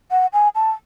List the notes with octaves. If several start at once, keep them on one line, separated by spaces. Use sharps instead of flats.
F#5
G#5
A5